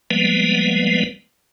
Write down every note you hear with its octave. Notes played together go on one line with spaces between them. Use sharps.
F3 G3 G#3 A#3 B3 B4